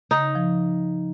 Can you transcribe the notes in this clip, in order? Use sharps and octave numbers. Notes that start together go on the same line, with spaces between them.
C#3 D#4
F3